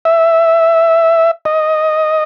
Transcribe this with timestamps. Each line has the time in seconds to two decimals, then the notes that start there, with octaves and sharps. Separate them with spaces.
0.05 E5
1.45 D#5